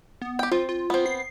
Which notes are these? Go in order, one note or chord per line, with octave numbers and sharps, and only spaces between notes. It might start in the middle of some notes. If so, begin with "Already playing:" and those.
B3
G4 G5
C4 F4
F4
B3 C4
C7